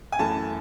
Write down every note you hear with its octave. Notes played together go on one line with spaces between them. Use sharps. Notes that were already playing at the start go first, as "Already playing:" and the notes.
G#5
F#2 E3 A3 A5